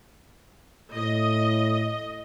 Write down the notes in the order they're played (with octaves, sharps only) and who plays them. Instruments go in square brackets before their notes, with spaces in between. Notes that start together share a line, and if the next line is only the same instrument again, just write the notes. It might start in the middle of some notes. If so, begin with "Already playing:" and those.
[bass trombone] A2 [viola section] D#5